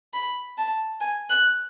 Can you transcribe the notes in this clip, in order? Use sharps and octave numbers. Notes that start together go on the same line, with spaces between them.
B5
A5
G#5
F#6